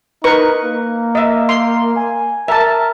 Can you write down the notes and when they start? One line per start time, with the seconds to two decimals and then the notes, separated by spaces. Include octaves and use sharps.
0.24 D#4 A#4 B4 C#6
0.64 A#3
1.15 D#5 E5
1.49 C6
1.96 G#5
2.48 A#4 E5 A5